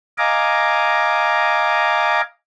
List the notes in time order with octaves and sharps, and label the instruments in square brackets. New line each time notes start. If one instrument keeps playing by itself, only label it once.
[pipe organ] D#5 F5 G#5 A#5 D6